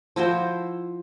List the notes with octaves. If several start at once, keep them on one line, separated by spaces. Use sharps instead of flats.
F3 E4 F#4 C5